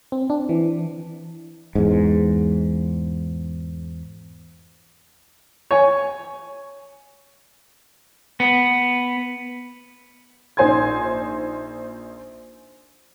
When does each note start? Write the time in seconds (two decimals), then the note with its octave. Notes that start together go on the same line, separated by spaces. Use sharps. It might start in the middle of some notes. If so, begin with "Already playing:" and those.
0.12 C4
0.30 D4
0.49 E3
1.75 E2 G#2
5.71 C#5 G#5
8.40 B3
10.57 A#1 D#4 C5 G#5 C6 G#6